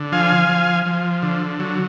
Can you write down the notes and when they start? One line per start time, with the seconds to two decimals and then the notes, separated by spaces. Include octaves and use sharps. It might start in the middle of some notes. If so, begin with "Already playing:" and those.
Already playing: D3
0.12 F3 F5 G#5
0.49 F3
0.86 F3
1.23 D3
1.60 F#3